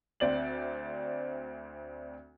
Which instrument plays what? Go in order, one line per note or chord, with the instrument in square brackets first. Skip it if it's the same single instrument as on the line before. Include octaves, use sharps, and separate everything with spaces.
[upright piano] D2 C4 D5 F#7